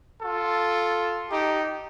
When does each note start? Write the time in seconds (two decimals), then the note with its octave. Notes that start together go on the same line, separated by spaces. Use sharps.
0.22 F4 A4
1.29 D#4 G4